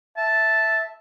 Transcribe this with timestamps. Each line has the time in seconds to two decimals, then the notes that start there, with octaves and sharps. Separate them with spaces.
0.17 E5 A5